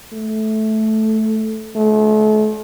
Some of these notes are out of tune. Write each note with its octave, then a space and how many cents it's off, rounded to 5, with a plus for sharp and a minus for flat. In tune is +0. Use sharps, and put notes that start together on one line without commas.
A3 -10
A3 -40